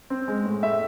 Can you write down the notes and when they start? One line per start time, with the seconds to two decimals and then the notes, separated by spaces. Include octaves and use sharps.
0.10 C4
0.28 G#3
0.45 A2
0.63 A2 E5